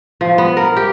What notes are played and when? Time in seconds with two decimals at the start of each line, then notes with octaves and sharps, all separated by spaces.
0.21 F3
0.38 B3
0.57 A#4
0.76 G4